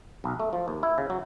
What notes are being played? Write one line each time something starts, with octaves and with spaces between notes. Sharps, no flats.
B1
A3
F3
D#2
E4
C#3
F#3